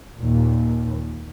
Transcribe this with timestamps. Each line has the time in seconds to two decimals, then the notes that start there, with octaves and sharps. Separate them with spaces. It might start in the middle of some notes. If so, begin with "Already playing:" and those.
0.17 D#2 A#2